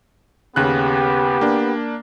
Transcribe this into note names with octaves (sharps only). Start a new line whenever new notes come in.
D#2 C#3 B3 G4 F#6
A#3 D4